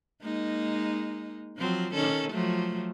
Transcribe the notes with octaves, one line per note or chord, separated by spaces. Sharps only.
G#3 A#3 D#4
F3 F#3 C4
D#3 C#4 A4
F3 F#3 A3